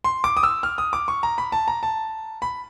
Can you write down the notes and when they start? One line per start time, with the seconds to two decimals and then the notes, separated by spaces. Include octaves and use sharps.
0.04 C6
0.24 D6
0.37 D#6
0.43 E6
0.63 F6
0.78 D#6
0.93 D6
1.08 C#6
1.23 A#5
1.38 B5
1.52 A5
1.68 A#5
1.83 A5
2.42 B5